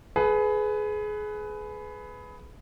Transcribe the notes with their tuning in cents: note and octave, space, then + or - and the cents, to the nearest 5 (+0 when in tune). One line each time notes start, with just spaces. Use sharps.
G#4 +25 B4 +10